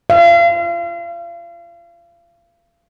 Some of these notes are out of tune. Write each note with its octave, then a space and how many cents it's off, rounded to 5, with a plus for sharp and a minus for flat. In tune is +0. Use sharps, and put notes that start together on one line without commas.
F5 -35